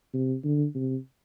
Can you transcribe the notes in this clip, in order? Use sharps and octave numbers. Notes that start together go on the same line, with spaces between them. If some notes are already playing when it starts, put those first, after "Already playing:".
C3
D3
C3